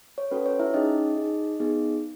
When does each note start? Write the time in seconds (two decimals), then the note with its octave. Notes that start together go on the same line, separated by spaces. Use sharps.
0.18 C#5
0.31 C#4 F#4 A4 B4
0.46 C#5
0.59 E4 E5
0.74 C#4 D#4 G#4 D#5
1.17 D#4 G#4
1.60 B3 D#4 G#4